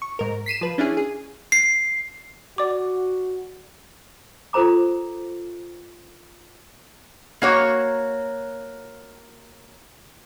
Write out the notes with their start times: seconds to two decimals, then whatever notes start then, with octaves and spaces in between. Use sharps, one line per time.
0.02 C#6
0.19 G#2 A#4
0.46 B6 C7 D#7 E7
0.61 F3 B4
0.78 C#4 D4 E4 G#4
0.97 G#4
1.52 C7
2.58 F#4 D5 D6
4.53 F4 A4 C5 A#5 D6
7.42 A#3 F#4 C#5